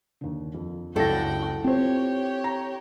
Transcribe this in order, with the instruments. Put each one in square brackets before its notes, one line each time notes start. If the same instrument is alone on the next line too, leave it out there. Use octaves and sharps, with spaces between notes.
[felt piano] D#2 D3
F2
[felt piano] F#1 C#2 A#6 [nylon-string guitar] D4 E4 A4 [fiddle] F#4 G5
[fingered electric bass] C4 [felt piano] F4 C5 [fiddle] G4 C#5
[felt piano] A#5